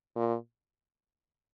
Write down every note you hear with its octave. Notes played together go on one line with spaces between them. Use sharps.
A#2